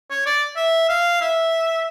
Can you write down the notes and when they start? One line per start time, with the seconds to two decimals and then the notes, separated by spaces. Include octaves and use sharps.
0.10 C#5
0.26 D5
0.57 E5
0.89 F5
1.21 E5